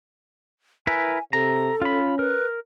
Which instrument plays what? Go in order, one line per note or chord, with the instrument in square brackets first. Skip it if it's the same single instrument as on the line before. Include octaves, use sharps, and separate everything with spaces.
[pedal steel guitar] E4 A#4 B4 [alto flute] G#5
[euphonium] C3 [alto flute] A4 [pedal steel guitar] A#5
[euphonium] C#4 [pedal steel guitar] F4 B5
[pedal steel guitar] A#4 [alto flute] B4